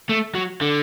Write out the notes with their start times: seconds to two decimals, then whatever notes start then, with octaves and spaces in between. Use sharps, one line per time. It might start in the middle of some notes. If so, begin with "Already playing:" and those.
0.09 A3
0.34 F#3
0.61 D3